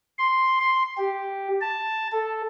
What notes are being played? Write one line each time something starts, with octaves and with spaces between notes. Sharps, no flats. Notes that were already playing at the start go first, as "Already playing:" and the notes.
C6
C6
G4
A5
A4